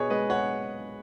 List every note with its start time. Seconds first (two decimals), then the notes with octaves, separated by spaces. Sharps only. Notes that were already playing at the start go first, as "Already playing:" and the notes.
Already playing: B2 G#4 B4 C#5 D#5
0.10 G#3 B4 D#5
0.30 C#5 F#5